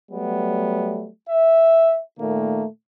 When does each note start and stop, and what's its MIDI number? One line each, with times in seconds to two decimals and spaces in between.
0.12 1.08 54
0.12 1.08 55
0.12 1.08 57
0.12 1.08 59
1.30 2.00 76
2.19 2.65 46
2.19 2.65 51
2.19 2.65 57
2.19 2.65 58